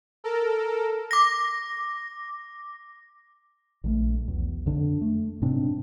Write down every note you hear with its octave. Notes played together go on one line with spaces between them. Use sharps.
A4 A#4
D6 A#6
A#1 F3 A3
B1 E2
F2 D3 D4
A3
G#2 C3 C4 D4